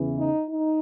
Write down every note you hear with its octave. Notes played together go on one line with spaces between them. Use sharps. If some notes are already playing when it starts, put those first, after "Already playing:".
Already playing: E2 C#3 E3
D#4
D#4